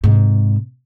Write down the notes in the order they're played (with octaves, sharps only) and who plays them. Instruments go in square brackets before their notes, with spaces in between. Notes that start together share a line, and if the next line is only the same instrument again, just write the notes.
[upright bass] G#2 C3